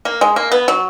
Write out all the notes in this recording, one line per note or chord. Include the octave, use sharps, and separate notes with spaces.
A#3
G#3
A#3
B3
F#3